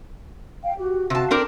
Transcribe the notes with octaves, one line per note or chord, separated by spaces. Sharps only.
F5 G5
F#4 G4
C3 F#4 F5 A5
C4 D4 A#4